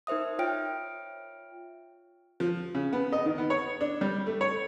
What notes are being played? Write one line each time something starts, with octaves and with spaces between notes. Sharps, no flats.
D#4 A#4 C5 E5 D#6
F4 C#5 E5 G5 F6 D7
F3
C#3
B3
D#5
D#3
B3
C#5
D4
G3
A3
C#5